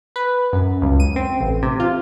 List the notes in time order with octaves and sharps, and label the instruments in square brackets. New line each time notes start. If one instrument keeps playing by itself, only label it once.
[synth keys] B4
F#2
C#2
D#7
C4
A1
C3
F4